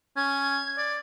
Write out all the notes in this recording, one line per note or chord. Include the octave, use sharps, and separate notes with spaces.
C#4 G#6
D5